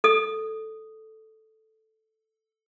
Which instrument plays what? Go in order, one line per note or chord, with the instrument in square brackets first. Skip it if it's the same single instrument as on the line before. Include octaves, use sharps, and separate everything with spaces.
[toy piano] A4 D#6